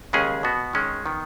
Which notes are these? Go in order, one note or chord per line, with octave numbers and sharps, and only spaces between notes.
D#2 C#3 G#3 C#4 G#4
B2 B3 F#4
D#3 G#3 C#4
D#3 B3